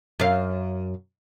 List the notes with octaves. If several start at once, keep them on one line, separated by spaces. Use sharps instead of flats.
F#2 F5